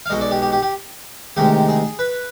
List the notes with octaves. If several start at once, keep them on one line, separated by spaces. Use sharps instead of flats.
F5
B1 B2 G#3 D#5
D5
G4
G4
G4
G4
D2 C3 D#3 G#3 G4
G#4
B4